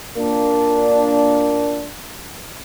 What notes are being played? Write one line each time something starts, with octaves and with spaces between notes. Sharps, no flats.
A#2 A#3 D4